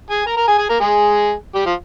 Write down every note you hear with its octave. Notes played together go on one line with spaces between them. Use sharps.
G#4 G#5
A#4 A#5
A#4 A#5
G#4 G#5
G#4 G#5
A#3 A#4
G#3 G#4
G3 G4
F3 F4